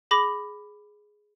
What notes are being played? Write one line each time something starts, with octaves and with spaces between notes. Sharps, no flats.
G#4 B5 D6 A#6 F#7